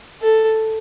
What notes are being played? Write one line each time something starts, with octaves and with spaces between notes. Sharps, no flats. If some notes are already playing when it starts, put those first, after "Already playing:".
A4